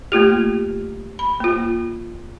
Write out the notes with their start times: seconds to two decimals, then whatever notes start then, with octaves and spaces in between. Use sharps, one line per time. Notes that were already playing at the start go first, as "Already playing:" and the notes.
0.12 A3 A#3 F4 G4
1.19 B5
1.40 A#3 F4